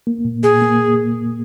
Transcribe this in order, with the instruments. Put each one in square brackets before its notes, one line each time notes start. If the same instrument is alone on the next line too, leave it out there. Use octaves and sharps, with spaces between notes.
[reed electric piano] A#3
A#2
[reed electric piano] A#2 [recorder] G#4
[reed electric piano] A#3